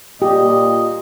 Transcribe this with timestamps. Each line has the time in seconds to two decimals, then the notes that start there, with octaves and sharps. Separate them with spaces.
0.22 A#2 G4 D#5